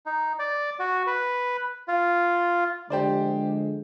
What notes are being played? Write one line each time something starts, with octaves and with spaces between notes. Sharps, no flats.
D#4
D5
F#4
B4
F4
D3 F3 G#3 G4 C5 D5